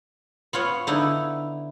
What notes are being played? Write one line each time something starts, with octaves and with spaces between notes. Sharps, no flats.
B3 F4 C#5 F#5
D3 D#4 E4